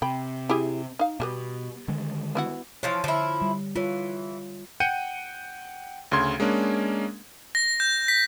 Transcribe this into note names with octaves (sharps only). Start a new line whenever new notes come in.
C3 G5 B5
E4 G4 G#4
D#4 F5
B2 G3 A3 B3
D3 D#3 G#3
B3 E4 F#4
E3 F3 C#5 F5
D3 F3 E4
G3
E3 F4 C#5
F#5 G5 G6 C#7 D#7
D2 C#3 C6 G#6
G#3 A#3 C#4 D4
A#6
G6
B6